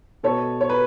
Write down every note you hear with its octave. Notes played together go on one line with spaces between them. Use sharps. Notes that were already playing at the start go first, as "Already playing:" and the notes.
B2 A4 C#5
C#5
B4